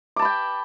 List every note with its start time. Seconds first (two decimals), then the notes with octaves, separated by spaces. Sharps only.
0.16 D6
0.19 A5
0.22 B5
0.25 G5